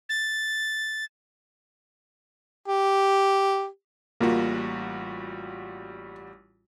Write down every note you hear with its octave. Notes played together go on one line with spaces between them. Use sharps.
A6
G4
A1 G3 A#3 F4 F#4